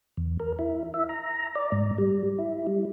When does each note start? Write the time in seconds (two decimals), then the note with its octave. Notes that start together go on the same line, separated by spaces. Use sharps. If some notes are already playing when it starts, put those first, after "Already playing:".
0.17 E2
0.40 A#4
0.59 E4
0.94 E5
1.09 A#5
1.55 D5
1.72 G#2
1.98 G3
2.39 E4
2.67 G3